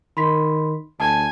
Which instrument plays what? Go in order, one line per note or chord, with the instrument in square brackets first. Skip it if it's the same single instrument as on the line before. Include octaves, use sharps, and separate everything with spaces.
[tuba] D#3 [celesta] B5 C6 B6
[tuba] D2 [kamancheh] G#5 [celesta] A5